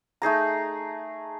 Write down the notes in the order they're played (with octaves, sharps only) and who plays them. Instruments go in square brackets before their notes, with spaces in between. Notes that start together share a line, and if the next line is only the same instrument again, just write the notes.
[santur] A3 D#4 G#4 A#5